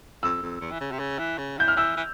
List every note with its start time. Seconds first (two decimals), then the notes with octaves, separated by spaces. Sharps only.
0.23 F2 E6
0.42 F2
0.61 E2
0.72 E3
0.81 C#3
0.92 C3
0.99 C#3
1.19 E3
1.38 C#3
1.58 E3 G6
1.68 F6
1.77 E3 E6
1.97 E3